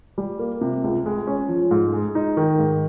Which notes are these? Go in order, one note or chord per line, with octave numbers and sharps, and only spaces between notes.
G3
A#3
C3
C#2
G#3
C#4
F3
G#2
G#3
D#4
D#3
G#2